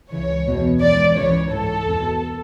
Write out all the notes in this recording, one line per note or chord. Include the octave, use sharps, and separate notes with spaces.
C#2 C#3 E3 C#5
E2 B2
G#2 E3 D5
C#2 C#3 E3 C#5
G#2 E3 A4
E2 B2